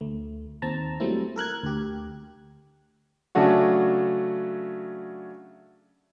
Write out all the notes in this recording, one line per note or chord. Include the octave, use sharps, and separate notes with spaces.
D2 A3
D#2 C4 A5 A#5
F#3 G3 A3 A#3 C4 E4
A4 A#4 F#6 G#6
D2 G4
C#3 F#3 A3 D4 F#4